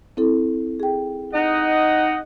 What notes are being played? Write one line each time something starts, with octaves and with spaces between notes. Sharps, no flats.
C4 E4 A4
G#4 G5
D#4 D#5 F#5